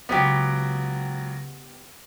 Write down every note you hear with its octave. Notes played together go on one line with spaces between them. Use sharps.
C#2 F#3 B3 G4